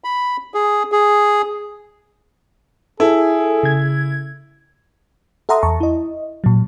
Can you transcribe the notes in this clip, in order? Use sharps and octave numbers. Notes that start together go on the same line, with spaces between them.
B5
G#4
G#4
E4 G#4 A4
C#3 G#6
A4 E5 F#5 A#5 C6 D#6
E2 A5 A#5 C#6
E4 D#5
A#2 F#3